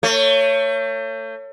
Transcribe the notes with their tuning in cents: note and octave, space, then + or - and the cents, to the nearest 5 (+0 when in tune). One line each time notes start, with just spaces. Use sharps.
A3 +35 C#5 +0